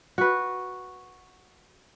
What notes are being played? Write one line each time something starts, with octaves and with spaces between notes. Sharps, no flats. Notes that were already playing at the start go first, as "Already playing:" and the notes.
F#4 B4